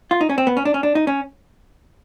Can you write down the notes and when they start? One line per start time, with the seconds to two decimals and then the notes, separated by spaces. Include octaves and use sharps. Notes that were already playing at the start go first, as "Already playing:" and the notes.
0.11 F4
0.21 D#4
0.30 C#4
0.38 C4
0.47 B3
0.57 C#4
0.65 D4
0.74 C#4
0.83 D4
0.95 D#4
1.07 C#4